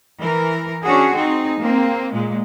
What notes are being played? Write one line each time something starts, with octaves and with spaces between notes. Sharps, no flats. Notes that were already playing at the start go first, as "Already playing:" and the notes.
E3 A#4
C#4 D4 F#4 G#4
C4 D#4 G#4
A#3 C4
A#2 G#3